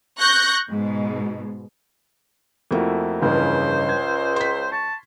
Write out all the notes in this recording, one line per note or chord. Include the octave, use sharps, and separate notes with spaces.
C#6 F#6 G6 A#6
G#2 B2
F2 A3 A#3 E4 F#4
C#2 G2 C#3 E3 C5
G#6
C6 B6
A5 C#6